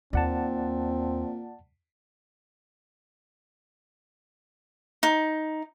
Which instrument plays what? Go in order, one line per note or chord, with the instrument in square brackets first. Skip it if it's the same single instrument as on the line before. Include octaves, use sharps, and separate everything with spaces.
[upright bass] D#2 [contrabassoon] A#2 [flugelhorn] C4 [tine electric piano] D5 F#5 A5
[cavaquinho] D#4